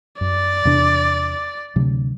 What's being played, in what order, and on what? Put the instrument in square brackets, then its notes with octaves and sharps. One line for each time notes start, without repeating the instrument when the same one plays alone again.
[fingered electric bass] F#2 [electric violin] D5
[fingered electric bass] E2 C3 D4
D2 C3 F#3